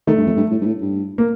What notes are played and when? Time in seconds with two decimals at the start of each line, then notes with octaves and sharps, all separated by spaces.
0.07 D#3 A3
0.17 G2
0.26 F2
0.36 G2
0.51 A2
0.61 G2
0.66 A2
0.81 G2
1.18 A#3